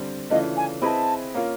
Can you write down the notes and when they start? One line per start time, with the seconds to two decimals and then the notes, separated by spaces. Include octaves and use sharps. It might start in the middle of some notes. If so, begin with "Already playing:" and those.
Already playing: D3 G3 C4
0.30 C#3 E3 A3 D4 F4 D#5
0.56 G#5
0.82 C4 E4 G#4 B4 D#5 A5 B5
1.34 A#3 C#4 F4 A#4